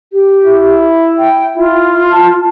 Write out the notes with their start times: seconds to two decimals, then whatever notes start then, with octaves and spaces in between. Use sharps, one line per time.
0.13 G4
0.45 E4
1.19 G5
1.57 E4 F4
2.12 A5